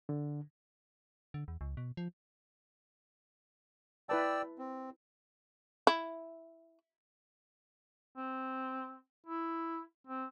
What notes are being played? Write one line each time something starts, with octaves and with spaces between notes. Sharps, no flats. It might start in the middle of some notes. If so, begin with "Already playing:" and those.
D3
D3
E2
C#2
B2
F3
E4 B4 D5 G5 A5 E6
C4
E4
C4
E4
C4